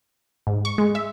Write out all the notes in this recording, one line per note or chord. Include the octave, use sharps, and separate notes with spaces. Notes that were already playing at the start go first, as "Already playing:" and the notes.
G#2
C#6
G#3
E5